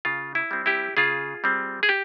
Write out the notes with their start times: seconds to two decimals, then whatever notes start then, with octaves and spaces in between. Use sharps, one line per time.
0.05 C#3 F4
0.35 E4
0.51 G3 C4
0.66 E4 G4
0.97 C#3 F4 G#4
1.44 G3 C4
1.83 G#4
1.89 G4